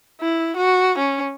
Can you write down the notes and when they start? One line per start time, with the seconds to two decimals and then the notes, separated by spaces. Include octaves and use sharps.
0.21 E4
0.57 F#4
0.98 C#4